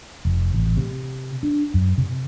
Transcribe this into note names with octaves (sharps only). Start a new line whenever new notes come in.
F1
A1
C3
D4
F#2
C3